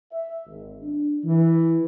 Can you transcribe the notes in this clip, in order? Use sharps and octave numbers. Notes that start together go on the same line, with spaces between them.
E5
G#1
D4
E3